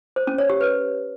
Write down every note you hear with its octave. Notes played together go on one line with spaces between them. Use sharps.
C5
C#4
C#5
G4
B4